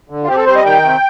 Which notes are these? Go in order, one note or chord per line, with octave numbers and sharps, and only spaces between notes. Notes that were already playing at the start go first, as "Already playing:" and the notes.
D3
F4
C4 G4
A4
G3 C5
D#5
D#3 G5
C3